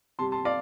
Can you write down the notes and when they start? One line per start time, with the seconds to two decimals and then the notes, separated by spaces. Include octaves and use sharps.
0.19 C3 A5 C6
0.22 G3
0.32 A5 C6
0.45 D5 F5